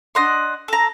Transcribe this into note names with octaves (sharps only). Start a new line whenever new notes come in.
D4 D#5 F#5 C6
A4 A#5